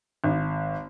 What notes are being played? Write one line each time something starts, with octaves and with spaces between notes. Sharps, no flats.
G#1